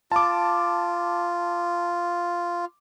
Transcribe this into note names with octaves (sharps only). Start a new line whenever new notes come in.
F4 A5 D6